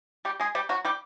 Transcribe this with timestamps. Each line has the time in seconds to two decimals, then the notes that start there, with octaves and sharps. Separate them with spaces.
0.25 G3 G4
0.40 G#3 G#4
0.55 G3 G4
0.69 F#3 F#4
0.85 G3 G4